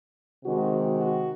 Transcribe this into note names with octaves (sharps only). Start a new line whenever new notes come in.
C3 D#3 G#3 F#4
F#4